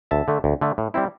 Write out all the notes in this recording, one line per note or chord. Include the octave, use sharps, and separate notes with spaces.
D2 E5 A5
D3 A3
D2
D3 A3
A2
G3 C4 E4